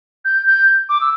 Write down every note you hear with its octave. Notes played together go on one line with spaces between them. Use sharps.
G6
G6
D6
E6